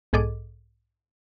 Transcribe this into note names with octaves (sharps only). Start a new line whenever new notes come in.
B1 G#2 G#4 A4 D#5 D6